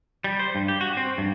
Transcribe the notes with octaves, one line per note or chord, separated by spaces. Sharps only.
G3
C5
G2
G4
F#4
C4
G2